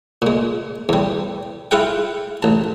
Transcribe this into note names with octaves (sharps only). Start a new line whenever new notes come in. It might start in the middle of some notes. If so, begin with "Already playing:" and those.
A#2 G#3
E2 G3
E4 F4 G#4 F#5 G5
A1 A5